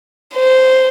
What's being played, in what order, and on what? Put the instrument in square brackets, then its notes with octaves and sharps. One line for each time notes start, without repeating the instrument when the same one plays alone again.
[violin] C5